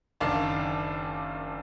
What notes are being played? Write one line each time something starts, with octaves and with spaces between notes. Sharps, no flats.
F#1 D#3 D4 F5 A5